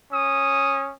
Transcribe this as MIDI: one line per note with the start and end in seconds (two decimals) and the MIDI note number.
0.12 0.91 61
0.12 0.91 87